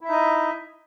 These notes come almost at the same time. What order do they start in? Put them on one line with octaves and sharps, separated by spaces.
E4 E5 D#4 D#5